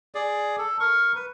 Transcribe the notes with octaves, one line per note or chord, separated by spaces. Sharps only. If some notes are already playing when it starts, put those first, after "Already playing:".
G#4 D5
A4
A#4 C#6
B4